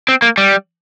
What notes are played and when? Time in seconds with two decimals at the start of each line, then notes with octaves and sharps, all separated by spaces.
0.09 C4
0.22 A#3
0.38 G3